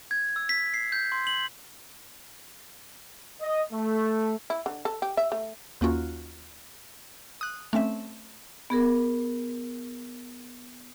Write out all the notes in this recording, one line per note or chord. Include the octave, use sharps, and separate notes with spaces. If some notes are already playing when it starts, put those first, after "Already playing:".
G#6
E6
B6
C7
G6
C6
F#7
D#5
A3
E4
D3
A4
G4
E5
A3
D#2 A#3 C#4 F4 F#4
D#6 F#6
A3 C4 C#4 E5
B3 G#4 A#4